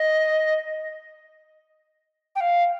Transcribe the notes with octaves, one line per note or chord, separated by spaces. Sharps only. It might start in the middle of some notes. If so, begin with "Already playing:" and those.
Already playing: D#5
G5
F5